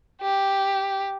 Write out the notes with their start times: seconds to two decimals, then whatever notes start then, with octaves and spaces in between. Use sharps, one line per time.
0.22 G4